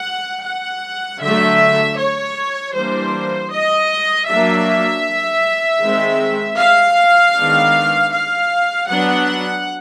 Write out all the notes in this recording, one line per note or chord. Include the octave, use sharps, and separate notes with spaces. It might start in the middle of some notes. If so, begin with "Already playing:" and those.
Already playing: F#5
F#5
D3 F#3 A3 E5
C#5
E3 G3 A#3 D4 C5
D#5
F#3 A#3 D4 E5
D#3 G#3 C4
F5
D#3 G#3 B3 D4
F5
F#3 B3 D4 F#5